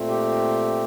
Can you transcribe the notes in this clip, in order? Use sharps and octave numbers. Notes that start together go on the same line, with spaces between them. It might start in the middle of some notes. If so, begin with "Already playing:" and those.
Already playing: A#2 A3 C4
G4